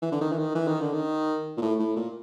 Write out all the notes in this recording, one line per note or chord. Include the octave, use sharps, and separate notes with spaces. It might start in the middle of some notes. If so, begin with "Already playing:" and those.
E3
D3
D#3
E3
D#3
E3
D#3
D3
D#3
A#2
A2
A2
A#2